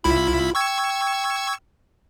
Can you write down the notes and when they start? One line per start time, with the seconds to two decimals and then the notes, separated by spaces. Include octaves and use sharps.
0.04 C2 E4 F4 B5
0.55 G5 C#6 E6 G#6